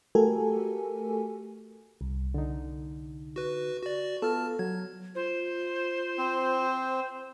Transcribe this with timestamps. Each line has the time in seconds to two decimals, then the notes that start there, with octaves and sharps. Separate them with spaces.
0.15 A3 F#4 G4 A4 A#4 G#5
2.01 C2
2.34 D3 D#4
3.36 F#4 B4
3.82 F#4 D5
4.22 B3 F4 A4 A5 F6
4.59 F#3 G#6
5.15 F4 C5
6.18 C4